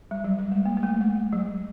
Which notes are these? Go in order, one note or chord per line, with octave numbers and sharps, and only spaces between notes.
G3
F#3
G3
G#3
A#3
A#3
A3
G#3
F#3